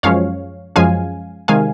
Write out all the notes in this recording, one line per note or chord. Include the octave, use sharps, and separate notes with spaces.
F#2 F3 G#3 C#4 C#5 F5
F#2 F3 G#3 C#4 F5 G#5
C3 D#3 G#3 F5 G#5